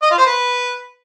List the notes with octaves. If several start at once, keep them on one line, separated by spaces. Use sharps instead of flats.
D#5
F4
C5
B4